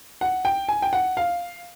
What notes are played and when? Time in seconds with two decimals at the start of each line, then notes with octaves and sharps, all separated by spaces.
0.21 F#5
0.45 G5
0.69 G#5
0.82 G5
0.93 F#5
1.17 F5